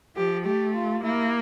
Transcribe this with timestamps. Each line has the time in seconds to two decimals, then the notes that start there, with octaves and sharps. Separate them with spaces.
0.16 F3 G4
0.45 A3 G4
0.75 F4
1.04 A#3 E4